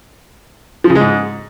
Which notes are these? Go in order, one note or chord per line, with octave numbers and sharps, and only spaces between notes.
F3
C#3
G#3
G#2